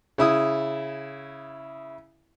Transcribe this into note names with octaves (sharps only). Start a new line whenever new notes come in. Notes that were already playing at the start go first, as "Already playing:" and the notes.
C#3 E4 D#6